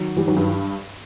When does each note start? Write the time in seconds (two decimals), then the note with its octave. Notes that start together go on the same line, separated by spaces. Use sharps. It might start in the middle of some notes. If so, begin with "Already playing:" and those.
Already playing: D#3 F#3
0.16 E3 G3
0.28 D#3 F#3
0.37 G2